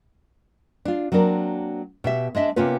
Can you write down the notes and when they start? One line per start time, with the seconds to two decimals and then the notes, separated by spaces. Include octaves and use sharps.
0.85 D4 F4
1.12 F#3 A#3 C4 D4 A#4
2.04 B2 G4 E5
2.35 G#3 D4 D#5 E5
2.56 C3 A#3 B3 C#4 F4 B4